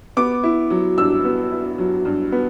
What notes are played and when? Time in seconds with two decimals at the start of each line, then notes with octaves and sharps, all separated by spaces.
0.17 B3 D6
0.43 E4
0.70 F#3
0.98 G2 E6
1.24 B3
1.52 E4
1.78 F#3
2.05 G2
2.32 B3